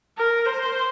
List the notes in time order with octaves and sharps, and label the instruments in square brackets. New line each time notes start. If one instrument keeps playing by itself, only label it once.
[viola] A#4
C5